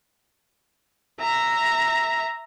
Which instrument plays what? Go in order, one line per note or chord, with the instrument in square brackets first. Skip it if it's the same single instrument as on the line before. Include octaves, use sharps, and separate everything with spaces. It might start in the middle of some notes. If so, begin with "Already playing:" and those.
[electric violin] E5 A#5